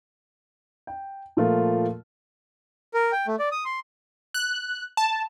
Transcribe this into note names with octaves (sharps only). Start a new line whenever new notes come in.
G5
A#2 F3 A3 F4 A#4
A#4
G5
A3
D5
D#6
C6
F#6
A5